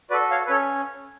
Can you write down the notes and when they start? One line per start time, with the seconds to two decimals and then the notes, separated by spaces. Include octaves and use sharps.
0.10 F#4 B4 D5
0.13 A4
0.31 C#5 F5
0.46 B4
0.50 C#4 A4 C#5